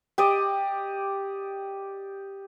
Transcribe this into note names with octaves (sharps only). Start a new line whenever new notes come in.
G4 D5 D#5